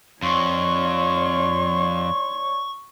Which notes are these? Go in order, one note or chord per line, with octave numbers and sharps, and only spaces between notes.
F2 C#5 D5 C6 C#6